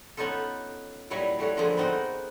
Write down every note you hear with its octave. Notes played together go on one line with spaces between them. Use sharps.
B3 C#4 D#4 F4 A4
A#2 F#3 G3 E4 C#5 D#5
G3 A3 F#4 C#5
D3 F3 A#3 C4 E4 G#4
B3 C4 D#4 F#4 A#4